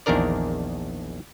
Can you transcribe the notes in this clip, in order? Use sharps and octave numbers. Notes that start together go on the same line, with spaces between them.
A#1 E2 D#3 D4 A#4 D5